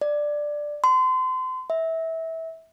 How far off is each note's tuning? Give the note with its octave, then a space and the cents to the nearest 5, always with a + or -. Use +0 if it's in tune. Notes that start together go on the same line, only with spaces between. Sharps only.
D5 +5
C6 -30
E5 -20